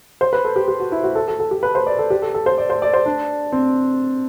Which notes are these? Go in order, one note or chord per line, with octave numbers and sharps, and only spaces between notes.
C5
B4
A4
G4
G4
F#4
E4
F#4
A4
A4
A4
G4
B4
C5
D5
A4
G4
A4
A4
C5
D5
C5
D5
C5
D4
C4